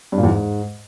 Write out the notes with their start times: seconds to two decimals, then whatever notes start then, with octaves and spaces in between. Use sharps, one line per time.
0.12 G2
0.18 A#2
0.23 E2
0.29 G#2